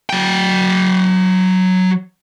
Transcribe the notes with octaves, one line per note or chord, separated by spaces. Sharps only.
F#3 G5